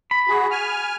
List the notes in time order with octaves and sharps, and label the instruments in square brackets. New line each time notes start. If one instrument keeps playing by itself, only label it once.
[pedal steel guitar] B5
[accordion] F#4 G#4
G#5 F6